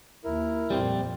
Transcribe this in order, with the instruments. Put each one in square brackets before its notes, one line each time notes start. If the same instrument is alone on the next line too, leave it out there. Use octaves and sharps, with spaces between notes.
[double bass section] D#2 [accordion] E4 A#4
[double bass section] F2 A#2 [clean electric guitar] G3 C4